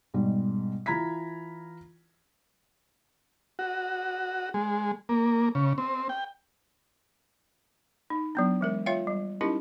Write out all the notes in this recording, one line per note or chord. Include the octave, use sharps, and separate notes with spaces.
G#2 B2 G3
E3 F4 A#5 B5 G#6 B6
F#4
G#3
A#3
C#3
C4
G5
D#4
F#3 B3 D4
E3 G#3 A#4
F4 C#5 E5 F5 G5
G3
C#4 D#4 E4 G4 A#4 D#5